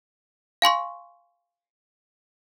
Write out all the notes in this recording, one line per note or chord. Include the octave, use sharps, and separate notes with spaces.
F5 G#5 C6 C#6